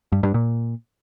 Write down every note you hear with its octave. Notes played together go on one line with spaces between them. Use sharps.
G2
G2
A#2